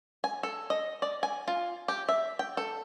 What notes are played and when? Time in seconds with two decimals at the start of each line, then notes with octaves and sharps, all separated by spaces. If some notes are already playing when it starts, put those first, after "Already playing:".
0.24 G#5
0.43 A4
0.70 D#5
1.02 D5
1.23 G#5
1.48 F4
1.88 G4
2.09 E5
2.39 G5
2.57 A4